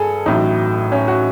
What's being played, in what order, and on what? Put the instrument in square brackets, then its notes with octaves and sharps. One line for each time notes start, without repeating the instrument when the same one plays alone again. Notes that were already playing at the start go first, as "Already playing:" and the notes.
Already playing: [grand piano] G2 G#4 A4
A1 A2 F#3 D#4
C#4
F#4